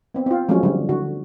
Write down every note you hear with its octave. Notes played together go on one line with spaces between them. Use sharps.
B3 C4
C4 F4
F3 F#3 G#3 A3 C4 C#4
D3 G3
D3 F#4